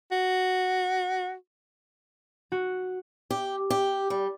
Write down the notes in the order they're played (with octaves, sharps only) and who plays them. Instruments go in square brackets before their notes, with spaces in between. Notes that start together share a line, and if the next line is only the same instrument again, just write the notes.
[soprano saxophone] F#4
[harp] F#4
[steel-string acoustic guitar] G4
G4
G3